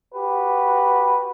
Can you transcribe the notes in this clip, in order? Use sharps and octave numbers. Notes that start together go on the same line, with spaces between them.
F#4 G4 B4